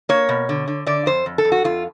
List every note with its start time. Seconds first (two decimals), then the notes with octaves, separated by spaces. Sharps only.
0.09 A#3 C#5
0.29 B2
0.49 D3
0.67 D3
0.86 D3 D5
1.06 F2 C5
1.26 F2
1.38 A4
1.45 F2
1.52 F#4
1.64 F2 F4